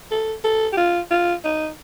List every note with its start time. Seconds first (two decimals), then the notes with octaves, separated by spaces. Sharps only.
0.11 A4
0.44 A4
0.73 G4
0.77 F4
1.11 F4
1.44 D#4